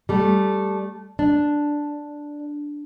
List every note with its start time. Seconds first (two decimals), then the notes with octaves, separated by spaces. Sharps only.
0.09 G3 A3
1.19 D4